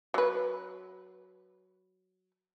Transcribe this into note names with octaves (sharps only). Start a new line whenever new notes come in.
F#3 B4